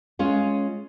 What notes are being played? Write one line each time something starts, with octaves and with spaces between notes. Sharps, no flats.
G#3 C#4 F4